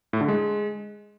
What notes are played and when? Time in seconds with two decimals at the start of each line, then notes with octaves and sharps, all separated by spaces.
0.13 A2
0.21 D3
0.28 G#3